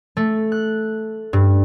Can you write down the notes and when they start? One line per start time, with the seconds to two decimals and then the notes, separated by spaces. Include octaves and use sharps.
0.17 A3
0.52 F#6
1.33 G2